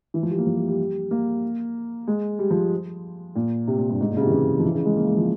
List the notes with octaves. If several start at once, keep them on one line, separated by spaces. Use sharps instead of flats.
E3
F3
G3
A#3
F3
G3
G3
A#3
G#3
G3
F3
A#2
C3
A#2
G2
G#2
A#2
C#3
C3
E3
C#3
F3
E3
C#3
G#3
A#3
G#3
F3